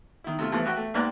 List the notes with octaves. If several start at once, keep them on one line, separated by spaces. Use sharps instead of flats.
D#3 E4
C3 A3 F4
G2 E3 F3 A3
F#4 G4 B4 E5 G5
A3
G#2 A#3 G4 B4 D5 A#5